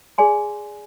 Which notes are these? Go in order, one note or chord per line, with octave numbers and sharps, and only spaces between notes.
G#4 D5 G#5 C6